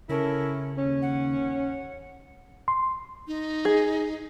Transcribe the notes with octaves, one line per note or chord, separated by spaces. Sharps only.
C#3 C#4 E4 A4 A#4
D#2 C#4
F#5
C6
D#4
G#4